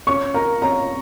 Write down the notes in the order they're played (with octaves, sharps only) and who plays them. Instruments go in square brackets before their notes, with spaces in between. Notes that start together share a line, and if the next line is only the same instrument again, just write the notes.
[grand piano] C#4 [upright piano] C#6
[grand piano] A#4 [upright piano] A#5
[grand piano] C#4 [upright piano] A#5